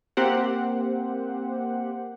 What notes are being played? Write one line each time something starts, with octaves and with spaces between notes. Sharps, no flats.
A#3 C4 G4 C5 F#5